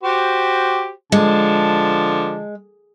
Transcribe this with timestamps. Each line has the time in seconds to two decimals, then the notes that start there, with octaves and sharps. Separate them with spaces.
0.03 F#4 G4 C5
1.12 D3 F3 G#3 A5